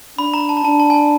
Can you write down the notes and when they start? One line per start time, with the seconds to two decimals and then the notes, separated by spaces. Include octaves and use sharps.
0.18 D4 B5
0.34 A#5
0.49 A5
0.57 A#5
0.64 D4 A5
0.79 A5
0.90 G#5
0.94 A5